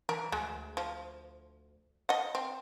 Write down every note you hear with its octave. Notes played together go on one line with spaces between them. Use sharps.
E3 A#4
D2 G#3
F3
D#5 F#5
C4